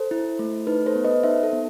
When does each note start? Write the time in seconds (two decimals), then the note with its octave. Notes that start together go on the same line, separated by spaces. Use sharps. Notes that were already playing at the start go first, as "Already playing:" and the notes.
Already playing: A4 C5
0.11 E4
0.39 A3
0.67 D#4 B4
0.86 A4 C5
0.96 B3
1.05 B4 D#5
1.23 D#4 C5 E5
1.43 A4
1.53 B3